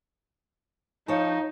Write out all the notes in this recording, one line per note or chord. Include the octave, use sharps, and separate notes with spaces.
F3 D#4 C#5 A5